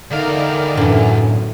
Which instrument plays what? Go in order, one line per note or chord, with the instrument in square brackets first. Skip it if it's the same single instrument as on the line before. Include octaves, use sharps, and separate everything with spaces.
[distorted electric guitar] E2 F5 [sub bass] D3 [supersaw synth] D#4 A#4 D5
[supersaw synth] F#2 [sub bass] A2 [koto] D3 E3